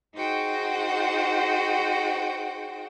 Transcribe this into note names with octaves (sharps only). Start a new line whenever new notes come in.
D#4 F#4 G#4 C5 F#5 G5